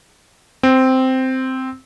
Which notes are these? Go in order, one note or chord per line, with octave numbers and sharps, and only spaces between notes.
C4